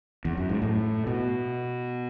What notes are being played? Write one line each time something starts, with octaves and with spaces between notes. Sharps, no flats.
E2
F#2
G#2
A2
B2